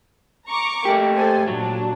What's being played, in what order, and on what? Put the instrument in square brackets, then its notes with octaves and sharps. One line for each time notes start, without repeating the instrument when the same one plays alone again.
[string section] A#5 C#6 D6
[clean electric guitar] A3 G4 [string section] A#3
[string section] A4 C5 G#5
[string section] A#2 D4 [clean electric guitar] F#3